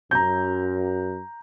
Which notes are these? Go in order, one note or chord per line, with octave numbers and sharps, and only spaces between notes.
F#2 A#5 G6